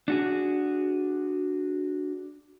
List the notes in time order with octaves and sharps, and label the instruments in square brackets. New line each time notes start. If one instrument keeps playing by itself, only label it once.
[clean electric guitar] D4 F#4 G#4